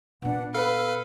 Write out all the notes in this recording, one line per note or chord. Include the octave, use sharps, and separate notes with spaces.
A#2 B3 D4 B4 F#5
A4 B4 F5 E6 F6